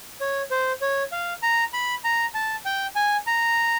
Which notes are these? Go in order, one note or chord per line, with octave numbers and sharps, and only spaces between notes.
C#5
C5
C#5
F5
A#5
B5
A#5
A5
G5
G#5
A#5